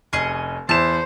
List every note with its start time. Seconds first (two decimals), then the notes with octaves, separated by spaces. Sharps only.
0.13 F1 C#4 G#4 D#5
0.69 E2 E4 C5 A5 E7